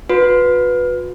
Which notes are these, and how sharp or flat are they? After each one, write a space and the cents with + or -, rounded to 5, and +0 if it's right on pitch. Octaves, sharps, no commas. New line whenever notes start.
F#4 -45 B4 +0